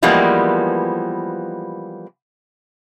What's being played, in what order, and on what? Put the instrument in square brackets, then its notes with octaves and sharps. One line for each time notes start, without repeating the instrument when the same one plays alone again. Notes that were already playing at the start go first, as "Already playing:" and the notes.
[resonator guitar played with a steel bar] E3 F3 G3 G#3 A#3 B3